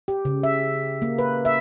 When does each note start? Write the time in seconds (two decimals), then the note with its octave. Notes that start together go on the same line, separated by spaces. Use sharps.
0.08 G4
0.25 C#3
0.43 E5
1.02 A#3
1.18 B4
1.45 E5